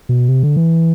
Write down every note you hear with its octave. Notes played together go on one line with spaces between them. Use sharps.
B2
C3
D3
E3